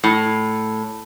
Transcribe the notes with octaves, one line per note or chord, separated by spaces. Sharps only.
A2